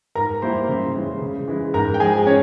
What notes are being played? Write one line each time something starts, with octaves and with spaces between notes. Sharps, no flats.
G#2 A#4 A#5
G3 A#3 E4 C5 C6
C#3
E3 G#3 C#4
C#3
E3 G#3
G#2 A#4 A#5
G5
F3 G#3 G#4 G#5
C#4 C#5